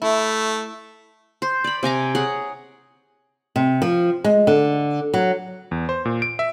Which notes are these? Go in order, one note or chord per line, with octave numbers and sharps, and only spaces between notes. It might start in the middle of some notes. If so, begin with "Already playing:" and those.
A3 E4
C5
D5 B5
C3 G#5 A#5 D6
G#4 C#5 F#5
C3
F3
G#3
D3
F#3
E2
C5
A#2
D7
E5